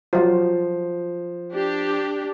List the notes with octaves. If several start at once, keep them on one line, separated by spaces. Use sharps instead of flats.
F3 F#3 F4 C5
D4 G4